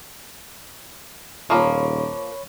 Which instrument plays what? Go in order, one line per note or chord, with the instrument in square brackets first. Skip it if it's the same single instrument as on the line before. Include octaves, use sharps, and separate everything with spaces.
[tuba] D#1 [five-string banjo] F3 A#3 [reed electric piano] C#5 B5 C#6